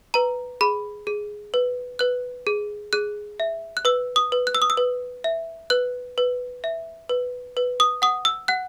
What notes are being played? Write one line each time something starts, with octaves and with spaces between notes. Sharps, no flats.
B4 A#5
G#4 B5
G#4
B4
B4 F#6
G#4
G#4 F#6
E5
F#6
B4 E6
D#6
B4
F#6
E6
D#6
E6
B4
E5
B4 F#6
B4
E5
B4
B4
D#6
F#5 D#6
E6
F#5 F#6